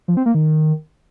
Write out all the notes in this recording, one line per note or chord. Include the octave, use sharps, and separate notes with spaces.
F3
C4
A#3
D#3